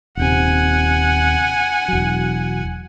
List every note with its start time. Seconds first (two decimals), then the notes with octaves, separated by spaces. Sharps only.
0.17 D#1 C3 F#5 G#5
1.88 E1 F#3